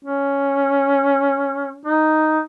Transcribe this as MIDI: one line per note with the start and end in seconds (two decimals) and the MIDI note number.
0.05 1.77 61
1.85 2.40 63